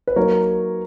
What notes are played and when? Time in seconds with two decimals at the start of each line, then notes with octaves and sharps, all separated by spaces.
0.07 B4
0.16 F#3 A#3 D#4 A#4 C#5